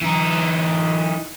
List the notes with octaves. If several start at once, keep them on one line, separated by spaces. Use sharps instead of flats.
E3 D#4